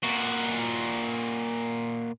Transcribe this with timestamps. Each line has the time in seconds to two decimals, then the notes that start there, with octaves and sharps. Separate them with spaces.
0.03 A#2 F#4